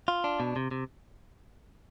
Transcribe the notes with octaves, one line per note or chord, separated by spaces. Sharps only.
F4
D4
B2
C3
C3